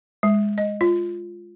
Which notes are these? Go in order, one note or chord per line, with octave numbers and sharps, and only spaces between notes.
G#3
D#5
F4